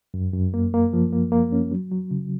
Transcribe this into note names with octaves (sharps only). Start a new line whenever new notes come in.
F#2
F#2
A#3
A#3
F3
A#3
A#3
C#4
F#3
F#3
C#3